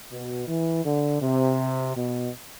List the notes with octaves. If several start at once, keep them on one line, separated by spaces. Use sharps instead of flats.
B2
E3
D3
C3
B2